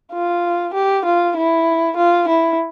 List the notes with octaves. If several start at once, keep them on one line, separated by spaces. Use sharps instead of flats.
F4
G4
F4
E4
F4
E4